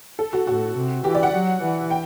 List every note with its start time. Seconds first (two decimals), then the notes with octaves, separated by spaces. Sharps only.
0.19 A4
0.33 F#4
0.47 A2 F#4
0.75 C3
1.04 E3 G4
1.15 D5
1.23 F#5
1.34 F#3
1.61 E3
1.91 G5